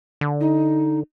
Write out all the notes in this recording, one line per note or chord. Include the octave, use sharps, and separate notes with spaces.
D3
D#4